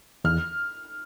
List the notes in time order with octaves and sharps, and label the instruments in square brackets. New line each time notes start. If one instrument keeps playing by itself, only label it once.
[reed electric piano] E2 [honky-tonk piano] F6